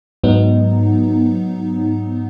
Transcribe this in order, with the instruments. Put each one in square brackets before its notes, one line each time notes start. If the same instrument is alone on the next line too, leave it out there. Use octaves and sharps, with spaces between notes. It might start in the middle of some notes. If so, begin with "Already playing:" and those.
[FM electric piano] G#2 F#3 B3 D#4